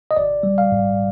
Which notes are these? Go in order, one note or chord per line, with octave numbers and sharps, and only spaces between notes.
D#5
G#1 D5
G3
F5
G#2